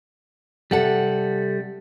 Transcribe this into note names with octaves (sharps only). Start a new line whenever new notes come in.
C3 G3 A4 F#5